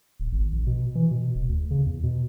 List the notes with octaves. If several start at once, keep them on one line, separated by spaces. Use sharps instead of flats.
D1
G#1
A#1
B2
E3
B2
D#1
D2
C#3
E2
B2